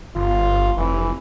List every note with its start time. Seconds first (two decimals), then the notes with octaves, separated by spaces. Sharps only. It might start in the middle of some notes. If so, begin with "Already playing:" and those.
0.16 G1 F4
0.77 F1 E3